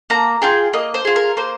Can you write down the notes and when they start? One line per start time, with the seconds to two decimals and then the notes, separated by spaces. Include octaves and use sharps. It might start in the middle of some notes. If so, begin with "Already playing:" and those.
0.10 A#3 A#5
0.42 F4 G#4 G5
0.73 A#3 D#5
0.94 C5
1.05 F4 G#4
1.16 A#4
1.37 A#3 C5